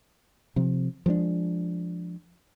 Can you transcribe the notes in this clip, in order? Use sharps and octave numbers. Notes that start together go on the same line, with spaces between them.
C3 F3
F3 G#3 C4 D4